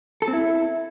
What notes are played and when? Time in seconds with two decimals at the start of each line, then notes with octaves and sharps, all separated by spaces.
0.22 A4
0.28 C4
0.33 E4